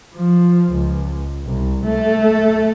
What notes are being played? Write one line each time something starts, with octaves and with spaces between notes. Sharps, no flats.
F3
C#2
C2
A3